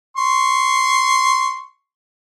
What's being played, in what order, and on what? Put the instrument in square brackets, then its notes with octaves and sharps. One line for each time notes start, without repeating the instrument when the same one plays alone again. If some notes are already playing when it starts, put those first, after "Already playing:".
[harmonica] C6 C#6